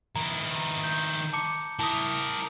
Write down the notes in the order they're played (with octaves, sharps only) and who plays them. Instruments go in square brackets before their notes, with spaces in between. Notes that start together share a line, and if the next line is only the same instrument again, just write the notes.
[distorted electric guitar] D#3 E4 [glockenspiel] A#5
[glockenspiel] G6
A5 D6 C#7
[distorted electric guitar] E4 A#4 [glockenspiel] A5 D#6